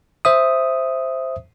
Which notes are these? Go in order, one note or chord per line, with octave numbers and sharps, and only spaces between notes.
C5 E5 D#6